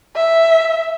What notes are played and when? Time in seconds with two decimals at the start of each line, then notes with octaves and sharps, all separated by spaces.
0.16 E5